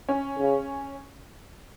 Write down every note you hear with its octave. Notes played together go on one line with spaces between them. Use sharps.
C#4
C#3